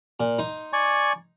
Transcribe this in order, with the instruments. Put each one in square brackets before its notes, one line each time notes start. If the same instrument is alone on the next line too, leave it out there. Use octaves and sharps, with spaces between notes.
[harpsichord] A#2
D#4 C6
[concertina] D5 G#5 C#6